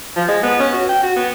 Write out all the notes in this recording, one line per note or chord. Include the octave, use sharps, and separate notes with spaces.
F3
G#3
B3
C#4
F#4
G5
F#4
B3